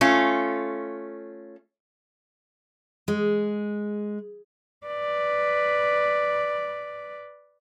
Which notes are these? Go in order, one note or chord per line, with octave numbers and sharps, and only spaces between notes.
A3 C#4 F4
G#3
B4 D5